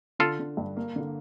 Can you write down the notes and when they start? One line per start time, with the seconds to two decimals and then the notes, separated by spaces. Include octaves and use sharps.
0.19 D3 F4 A4
0.39 D3
0.57 G2
0.77 A#3
0.96 D3